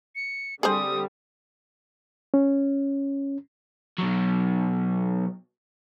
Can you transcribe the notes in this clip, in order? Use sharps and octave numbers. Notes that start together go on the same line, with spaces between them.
C#7
D3 G3 C4 G#4 C5 D#6
C#4
B2 F#3